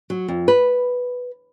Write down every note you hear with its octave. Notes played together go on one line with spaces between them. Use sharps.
F#3
F2
B4